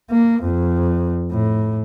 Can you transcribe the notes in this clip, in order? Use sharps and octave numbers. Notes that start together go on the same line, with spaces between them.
A#3
F2
A2